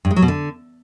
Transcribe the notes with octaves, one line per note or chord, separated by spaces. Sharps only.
G2
G#3
F#3
B2
D3